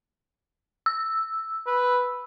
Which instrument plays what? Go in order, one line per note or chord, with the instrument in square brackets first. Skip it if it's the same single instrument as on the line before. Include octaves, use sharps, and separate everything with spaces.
[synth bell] E6
[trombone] B4